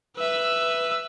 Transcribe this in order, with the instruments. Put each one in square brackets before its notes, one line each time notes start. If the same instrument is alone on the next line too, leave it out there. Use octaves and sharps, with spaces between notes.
[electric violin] B4 E5